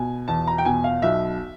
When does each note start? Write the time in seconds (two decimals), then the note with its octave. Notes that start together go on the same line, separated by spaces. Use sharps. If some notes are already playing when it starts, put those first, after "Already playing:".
Already playing: B2 G#5
0.28 E2 A5
0.47 A#5
0.58 G5
0.65 B2 G#5
0.84 F5
1.02 B1 E5